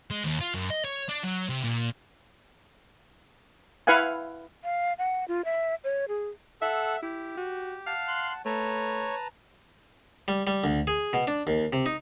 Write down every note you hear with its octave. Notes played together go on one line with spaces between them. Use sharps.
G#3
D#2
F4
F#2
D#5
C#5
D4
F#3
C3
A#2
E4 B4 F5 F#5 G#5
F5
F#5
F4
E5
C#5
G#4
A4 E5 F#5
E4 G4
F#4
F5 F#5 A5
C6 F#6
A3 B4 C#5 A5 A#5
G3
G3
D2
G#4
B2
D4
D#2
C3
D#4